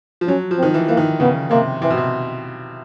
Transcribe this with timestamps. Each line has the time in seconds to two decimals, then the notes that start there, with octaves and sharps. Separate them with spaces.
0.21 F3
0.28 F#3 C#4
0.51 F3
0.58 C4
0.63 D#3
0.74 E3
0.88 E3 A#3
0.97 D#3
1.20 C#3 B3
1.50 C3 A#3
1.82 C3 E3
1.90 B2
1.97 C3